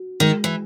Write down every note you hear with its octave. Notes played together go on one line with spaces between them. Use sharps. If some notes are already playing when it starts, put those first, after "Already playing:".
Already playing: F#4
D#3 G#3
E3